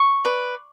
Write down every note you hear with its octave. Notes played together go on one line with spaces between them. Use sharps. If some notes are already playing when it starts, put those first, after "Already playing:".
Already playing: C#6
B4 D5